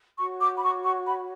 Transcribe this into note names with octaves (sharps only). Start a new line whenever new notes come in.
F#4 C#5 C#6
D6
B5
C#6
C#6
B5